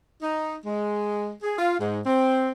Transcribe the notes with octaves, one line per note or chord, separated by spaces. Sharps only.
D#4
G#3
G#4
F4
G#2
C4